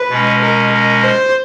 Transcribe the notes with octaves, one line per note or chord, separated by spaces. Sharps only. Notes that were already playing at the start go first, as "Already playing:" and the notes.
Already playing: B4
B2 G#3 C#4
A#4
A#4
C5